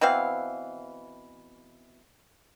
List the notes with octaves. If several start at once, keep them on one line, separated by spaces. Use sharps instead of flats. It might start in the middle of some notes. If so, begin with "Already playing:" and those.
B2 E3 C4 F5